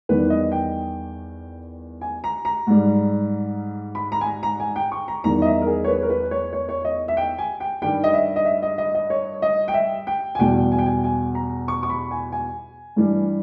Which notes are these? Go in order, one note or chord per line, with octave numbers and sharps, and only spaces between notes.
E2 D#3 G3 B4
D#5
G5
G#5
A#5
A#5
G#2 G3
B5
A#5
G#5
A#5
A#5
G#5
G5
C#6
A#5
E2 D#3 G3 A#5
D#5
E5
A#4
G#4
C#5
B4
A#4
B4
C#5
C#5
C#5
D#5
E5
G5
G#5
G5
G2 D#3 G3 G5
D#5
E5
D#5
E5
D#5
D#5
D#5
C#5
D#5
G5
E5
G5
G#5
E2 B2 G3 G5
G#5
G5
G#5
G#5
A#5
C#6
C#6
B5
G#5
G#5
G2 E3 G3